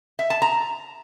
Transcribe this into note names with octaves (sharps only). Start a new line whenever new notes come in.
E5
A5
A#5